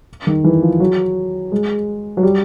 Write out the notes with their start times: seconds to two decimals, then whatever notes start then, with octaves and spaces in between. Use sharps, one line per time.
0.27 D#3
0.44 E3
0.62 F3
0.80 F#3
1.52 G#3
2.17 F#3
2.23 G3